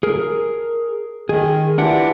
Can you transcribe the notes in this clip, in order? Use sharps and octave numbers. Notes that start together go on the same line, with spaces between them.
G#4 A#4
D#3 G#4
E3 D4 F4 G4 F#5